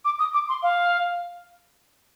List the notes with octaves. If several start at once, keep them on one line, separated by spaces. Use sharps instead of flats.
D6
D#6
D6
C6
F5